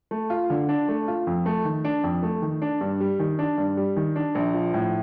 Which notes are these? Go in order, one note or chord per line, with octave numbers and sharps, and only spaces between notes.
A3
F4
D3
D4
A3
F4
F2
A3
D#3
D4
F2
A3
D#3
D4
G2
G3
D#3
D4
G2
G3
D#3
D4
A#1
F3
A2